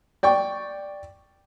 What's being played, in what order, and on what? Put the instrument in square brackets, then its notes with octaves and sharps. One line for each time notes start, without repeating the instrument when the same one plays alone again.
[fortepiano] D5 G5 C#6